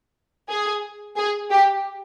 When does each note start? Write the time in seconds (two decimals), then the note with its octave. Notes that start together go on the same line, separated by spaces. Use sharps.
0.49 G#4
1.17 G#4
1.50 G4